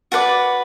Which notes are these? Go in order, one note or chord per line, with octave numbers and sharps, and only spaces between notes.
F#4 B4 D5 A5